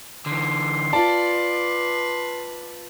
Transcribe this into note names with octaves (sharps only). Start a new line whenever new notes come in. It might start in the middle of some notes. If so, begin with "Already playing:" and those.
D3 E3 C6
F4 B4 D5 A5